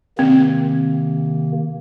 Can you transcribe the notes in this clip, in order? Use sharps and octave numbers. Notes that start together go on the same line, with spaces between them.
C3 D#3 A#3 C4